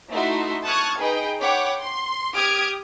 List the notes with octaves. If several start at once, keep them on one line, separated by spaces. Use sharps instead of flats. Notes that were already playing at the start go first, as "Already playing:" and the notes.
A3 D#4 E4 F#4 E5 C6
A5 C#6 D#6 F6 F#6 G#6
D#4 G#4 B4 D#5 G5
C#5 F#5 G5 B5 D6
C6
G4 D#6 F6 G#6 D7